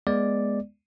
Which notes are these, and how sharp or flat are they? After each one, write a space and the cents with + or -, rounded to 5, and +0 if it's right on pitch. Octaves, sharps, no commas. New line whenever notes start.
G#3 +0 B3 -20 D5 +0